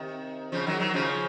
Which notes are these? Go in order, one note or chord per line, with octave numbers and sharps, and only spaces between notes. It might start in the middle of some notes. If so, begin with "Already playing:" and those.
Already playing: C3 D#3
C#3 F3
D#3 F#3
D#3 F#3
C#3 F3